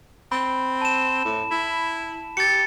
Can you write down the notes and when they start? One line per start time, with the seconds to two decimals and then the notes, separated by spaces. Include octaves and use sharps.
0.32 C4 B5
0.81 A5 E7
1.25 A2
1.51 E4
2.37 G4 A6 C#7